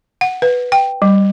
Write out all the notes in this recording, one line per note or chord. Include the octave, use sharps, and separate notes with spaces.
F#5
B4
G5
G3